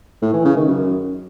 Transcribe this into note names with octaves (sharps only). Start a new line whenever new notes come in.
A2
E3
C#3
D#3
F#2